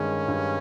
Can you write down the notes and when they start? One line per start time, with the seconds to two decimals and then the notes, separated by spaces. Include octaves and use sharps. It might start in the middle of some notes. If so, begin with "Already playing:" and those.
Already playing: G2 D#3 G#3 C#4
0.28 G2